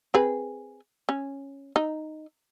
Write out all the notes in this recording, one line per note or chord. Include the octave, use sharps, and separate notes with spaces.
C4 G#4 B4
C#4
D#4